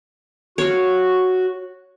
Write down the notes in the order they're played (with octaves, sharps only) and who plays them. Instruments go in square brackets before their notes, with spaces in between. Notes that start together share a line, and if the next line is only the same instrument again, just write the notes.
[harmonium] F#4 [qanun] C#5 F5